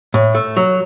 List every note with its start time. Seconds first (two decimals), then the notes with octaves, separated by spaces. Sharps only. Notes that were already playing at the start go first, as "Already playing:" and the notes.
0.14 A2
0.35 A3
0.57 F#3